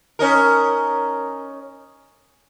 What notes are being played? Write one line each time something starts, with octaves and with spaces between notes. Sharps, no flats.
C#4 D#4 A#4